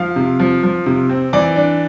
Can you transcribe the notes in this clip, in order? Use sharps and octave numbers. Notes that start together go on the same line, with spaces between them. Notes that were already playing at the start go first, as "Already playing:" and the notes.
Already playing: F3 F5
C3
F3
F3
C3
C4
E3 D5
D4